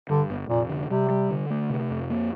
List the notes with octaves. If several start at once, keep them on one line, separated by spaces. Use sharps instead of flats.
G2 D3
G1
F1 A#2
D3
C3 G3
G3
D3
A3
C3
F2
A#3